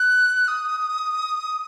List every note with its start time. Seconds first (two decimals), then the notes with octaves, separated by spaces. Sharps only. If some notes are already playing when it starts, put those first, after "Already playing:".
Already playing: F#6
0.48 D#6